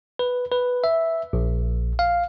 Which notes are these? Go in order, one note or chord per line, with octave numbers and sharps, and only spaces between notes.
B4
B4
E5
A#1
F5